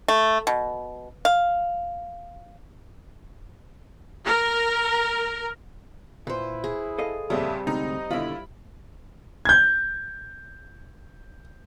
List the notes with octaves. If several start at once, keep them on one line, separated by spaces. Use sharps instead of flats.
A3
B2
F5
A#4
A#2 E4 B4 C5
G#4
A4 D#5 F5
F2 A#2 C#3 G3 C4 E5
D2 G#2 C3 D#4 D#5
D#2 B2 D3 E4 F4 B5
G6 G#6